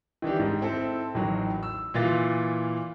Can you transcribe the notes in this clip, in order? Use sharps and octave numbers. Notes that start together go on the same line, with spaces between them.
D#3 E3 D4 G4
G#2
C4 E4 A4
A1 D#3 F#3
E6
A#2 E3 F4 F5 A6